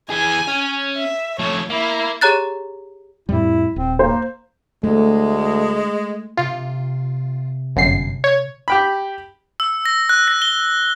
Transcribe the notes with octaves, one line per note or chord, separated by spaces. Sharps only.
E3 G#4 G#5
C#4
E5
F3 A3 C#5
A#3 E4
G4 G#4 C#5 A#5 F#6 A6
F2 A2 G3 E4
D#1 C4
A#3 C5
D2 G#3 A3
C3 F4
G1 F#2 C7
C#5
G4 G5 B5
E6
A#6
F#6
A#6
G7